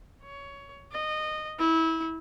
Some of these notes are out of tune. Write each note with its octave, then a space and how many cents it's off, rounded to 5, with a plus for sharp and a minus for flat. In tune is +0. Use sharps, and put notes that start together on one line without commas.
C#5 +15
D#5 -20
E4 -25